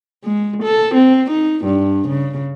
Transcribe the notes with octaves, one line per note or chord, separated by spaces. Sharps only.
G#3
A4
C4
D#4
G2
C#3